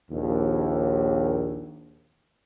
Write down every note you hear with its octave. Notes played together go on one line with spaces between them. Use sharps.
A#1 D#2